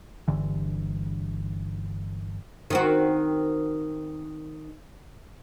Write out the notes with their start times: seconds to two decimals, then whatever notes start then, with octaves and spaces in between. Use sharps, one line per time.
0.28 G1 G2 D3 E3
2.70 D#3 C4 F#4